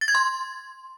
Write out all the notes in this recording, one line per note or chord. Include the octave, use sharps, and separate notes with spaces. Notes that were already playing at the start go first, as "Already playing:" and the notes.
A6
G#6
C6